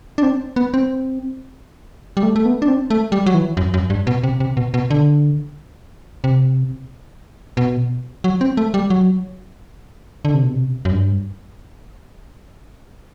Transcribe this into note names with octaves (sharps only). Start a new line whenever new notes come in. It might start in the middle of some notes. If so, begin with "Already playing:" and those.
D4
C4
B3
C4
G3
A3
A3
B3
D4
C4
A3
G3
F#3
E3
F#2
F#2
G2
B2
C3
C3
B2
B2
D3
C3
B2
F#3
C4
A3
G3
F#3
D3
C3
B2
C3
F#2
G2